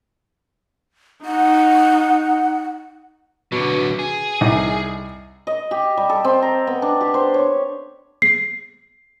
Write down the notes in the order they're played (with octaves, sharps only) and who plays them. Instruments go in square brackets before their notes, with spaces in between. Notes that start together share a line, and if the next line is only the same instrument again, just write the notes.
[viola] D#4 [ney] F#5
[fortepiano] B2 [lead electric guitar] D3 F#3
[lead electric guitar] G#4
[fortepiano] C2 D#4
[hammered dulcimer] D#5
G4
G3
A4
C4
A#5
B3
D4
G4
C5
C#5
[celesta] C7